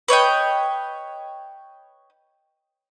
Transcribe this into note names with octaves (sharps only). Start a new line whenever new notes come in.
B4 C#5 D#5 G5